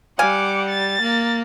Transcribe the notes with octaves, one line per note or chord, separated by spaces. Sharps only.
G3 F5 F#5 G#5 D6
A6
A#3